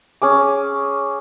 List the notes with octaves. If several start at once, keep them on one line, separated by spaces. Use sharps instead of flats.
C#4 G#4 D6